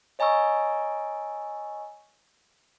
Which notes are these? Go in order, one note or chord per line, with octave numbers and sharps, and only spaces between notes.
C#5 D#5 G#5 A#5 C#6 E6